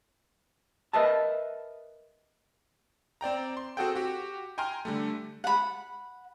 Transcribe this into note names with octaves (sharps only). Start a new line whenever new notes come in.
A#4 B4 D#5 E5 A5
C4 D5 G5 A#5
C6
C4 F#4 G#4 A4 F#5 G5
F#4 G4
G5 G#5 A#5 C6 F6
D3 G3 A3
F#5 B5